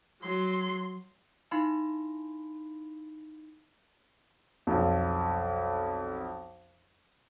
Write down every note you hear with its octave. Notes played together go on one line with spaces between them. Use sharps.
F#3 C6
D#4 E4 F5 B5 C6
B1 F2